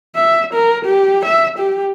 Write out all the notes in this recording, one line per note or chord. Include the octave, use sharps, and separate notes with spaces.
E5
A#4
G4
E5
G4